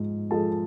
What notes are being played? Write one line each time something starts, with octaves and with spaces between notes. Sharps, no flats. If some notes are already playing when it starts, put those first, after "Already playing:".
Already playing: G#2 F3
F3 G#3 A4 A5